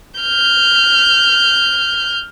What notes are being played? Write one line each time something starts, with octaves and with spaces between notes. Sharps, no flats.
F6 G6